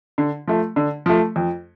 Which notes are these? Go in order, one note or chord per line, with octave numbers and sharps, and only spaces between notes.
D3
F3 A3
D3
F3 A3
F2